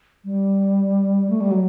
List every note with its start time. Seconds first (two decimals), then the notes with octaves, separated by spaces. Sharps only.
0.25 G3
1.30 A3
1.41 G3
1.51 F#3